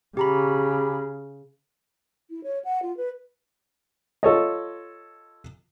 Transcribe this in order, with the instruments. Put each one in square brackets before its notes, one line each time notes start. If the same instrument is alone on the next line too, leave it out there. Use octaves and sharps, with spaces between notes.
[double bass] C#3 [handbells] G4 A#5 B5
[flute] E4
C#5
F#5
F4
B4
[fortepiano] F4 A4 C#5 D#5